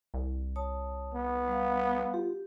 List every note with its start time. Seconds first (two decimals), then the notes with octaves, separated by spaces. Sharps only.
0.14 C2
0.56 C#5 A5 D#6
1.14 B3
1.48 G3 F5
2.14 F4 G4